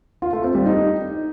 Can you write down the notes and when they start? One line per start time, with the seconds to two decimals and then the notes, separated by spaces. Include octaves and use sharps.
0.22 F4
0.33 A3
0.44 C4
0.55 G3
0.66 D#4